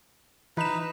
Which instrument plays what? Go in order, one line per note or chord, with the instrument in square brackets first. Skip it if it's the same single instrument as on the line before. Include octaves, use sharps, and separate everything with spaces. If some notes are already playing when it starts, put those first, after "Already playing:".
[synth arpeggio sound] E3 E7 [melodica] D#4 B4